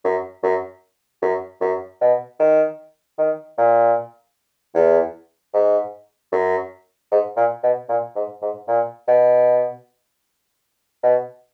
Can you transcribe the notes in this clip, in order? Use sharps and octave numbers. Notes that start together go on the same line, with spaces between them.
F#2
F#2
F#2
F#2
B2
D#3
D#3
A#2
E2
G#2
F#2
G#2
A#2
B2
A#2
G#2
G#2
A#2
B2
B2